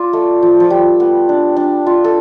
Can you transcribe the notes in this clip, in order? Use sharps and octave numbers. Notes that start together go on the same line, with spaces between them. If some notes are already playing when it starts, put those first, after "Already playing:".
Already playing: F4 D5
A3
F3
F3
G3
B3
D4
D4
F4
A4